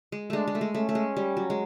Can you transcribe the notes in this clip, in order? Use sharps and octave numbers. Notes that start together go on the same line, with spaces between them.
G#3
G#3 A3 D4
G#3
A3
G#3
A3 C#4
A3
G#3
G3
F#3
G#3